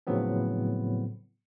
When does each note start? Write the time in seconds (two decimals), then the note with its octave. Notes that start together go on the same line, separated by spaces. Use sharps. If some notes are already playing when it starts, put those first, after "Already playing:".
0.07 A2 C#3 F3 F#3 B3 C4